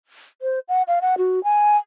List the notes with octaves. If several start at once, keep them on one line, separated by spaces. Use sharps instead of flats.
C5
F#5
F5
F#5
F#4
G#5